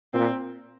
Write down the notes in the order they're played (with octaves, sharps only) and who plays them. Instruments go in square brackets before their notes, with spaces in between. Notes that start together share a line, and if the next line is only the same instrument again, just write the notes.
[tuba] A#2 [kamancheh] C4